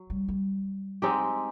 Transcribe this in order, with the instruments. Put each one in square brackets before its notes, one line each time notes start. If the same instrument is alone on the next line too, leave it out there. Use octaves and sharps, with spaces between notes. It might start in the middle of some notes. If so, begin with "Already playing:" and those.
Already playing: [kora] F#3
[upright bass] G3
G3
[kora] G#3 C4 D#4 G4